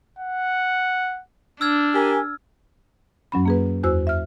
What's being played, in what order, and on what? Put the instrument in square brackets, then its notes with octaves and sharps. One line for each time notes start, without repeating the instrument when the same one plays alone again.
[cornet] F#5
[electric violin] D4 [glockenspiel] E6 F6 G#6
[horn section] G4 A#4 G#5
[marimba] F#2 F#3 C#4 B5
A#3 G#4 B4
E2 F#4 C5 E6
E5 F6